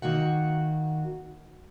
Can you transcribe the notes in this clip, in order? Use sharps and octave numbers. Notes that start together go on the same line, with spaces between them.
D#3 A#3 F#4 F#5